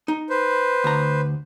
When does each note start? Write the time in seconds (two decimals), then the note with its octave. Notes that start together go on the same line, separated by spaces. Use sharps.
0.08 D#4
0.30 B4 C5
0.84 D2 A#5